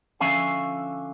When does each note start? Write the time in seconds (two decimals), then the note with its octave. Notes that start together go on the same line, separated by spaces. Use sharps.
0.20 D3 F3 C#4 E5 F5 G#5